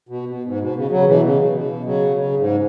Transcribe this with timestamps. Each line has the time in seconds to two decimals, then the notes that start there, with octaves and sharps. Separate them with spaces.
0.09 B2
0.29 B2
0.45 G#2
0.60 B2
0.77 C#3
0.91 C#3 F#3
1.07 B2 E3
1.23 C#3
1.39 B2
1.54 B2
1.85 C#3 F#3
2.16 C#3
2.38 G#2